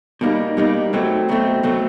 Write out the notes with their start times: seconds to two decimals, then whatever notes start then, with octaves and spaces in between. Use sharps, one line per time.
0.21 B2 G3 A#3 D#4
0.57 B2 G3 A#3 D#4
0.93 B2 F#3 A3 C4
1.29 B2 F#3 A3 C4
1.63 B2 F#3 A3 C4